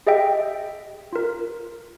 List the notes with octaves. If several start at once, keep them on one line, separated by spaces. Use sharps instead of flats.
G4 G#4 D#5 E5 G5
F4 A#4